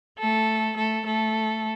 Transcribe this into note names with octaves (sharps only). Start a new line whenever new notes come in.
A3 A4
A3 A4
A3 A4